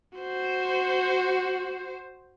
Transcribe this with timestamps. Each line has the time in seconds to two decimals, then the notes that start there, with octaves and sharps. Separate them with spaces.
0.18 F#4 C5